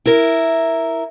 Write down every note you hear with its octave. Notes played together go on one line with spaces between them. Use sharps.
E4 A#4